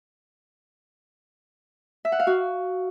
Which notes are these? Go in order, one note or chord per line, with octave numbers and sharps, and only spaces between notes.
E5
F#5
F5
F#4